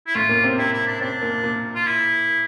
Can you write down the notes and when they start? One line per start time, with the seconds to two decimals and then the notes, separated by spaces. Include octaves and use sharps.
0.07 E4
0.15 A2 A3 F4
0.29 A#2 A#3
0.43 C3 C4
0.58 C3 C4 E4
0.73 E4
0.87 D4
1.01 C3 C4 D4
1.22 A#2 A#3
1.44 A#2 A#3
1.75 F4
1.86 E4